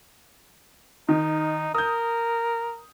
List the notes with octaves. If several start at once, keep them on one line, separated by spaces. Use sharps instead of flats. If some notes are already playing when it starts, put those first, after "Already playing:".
D#3 D#4
A#4 D#6 G6